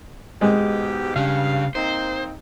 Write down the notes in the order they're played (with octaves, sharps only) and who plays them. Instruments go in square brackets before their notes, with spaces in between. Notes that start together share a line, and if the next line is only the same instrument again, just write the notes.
[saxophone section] G#2 B2 G4 [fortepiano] G#3
[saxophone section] G2 F5 [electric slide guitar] C#3
[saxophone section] A#3 C4 D#4 [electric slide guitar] C5